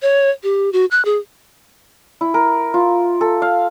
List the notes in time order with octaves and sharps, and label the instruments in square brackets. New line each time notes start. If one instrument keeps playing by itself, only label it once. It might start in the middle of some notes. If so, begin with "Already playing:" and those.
[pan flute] C#5
G4
F#4
F#6
G#4
[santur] E4
A#4
F4
A4
F5